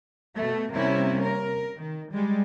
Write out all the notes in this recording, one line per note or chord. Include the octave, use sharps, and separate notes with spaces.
B2 A3
C3 G3 A#3 C#4 E4
A#4
D#3
G3 G#3